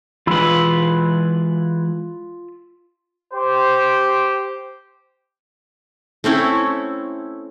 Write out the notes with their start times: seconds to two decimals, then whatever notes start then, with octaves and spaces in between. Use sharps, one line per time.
0.27 E3 G#3 F4 B4 B5 E6
3.33 G4 C5
6.24 A3 C4 C#4 E4